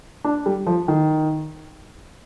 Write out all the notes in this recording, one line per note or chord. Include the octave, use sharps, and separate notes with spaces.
D4
G3
F3
D#3